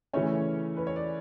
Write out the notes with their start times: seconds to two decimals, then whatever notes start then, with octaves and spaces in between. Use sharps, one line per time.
0.13 C#3 E3 A3 C#4 C#5
0.77 B4
0.87 C#5
0.96 D5